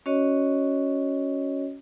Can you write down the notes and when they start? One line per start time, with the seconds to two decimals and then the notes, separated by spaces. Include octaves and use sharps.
0.06 C#4 F#4 C#5 D#5